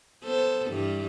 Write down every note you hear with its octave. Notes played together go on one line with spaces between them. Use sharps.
B3 A4 C5
G2 E3 G3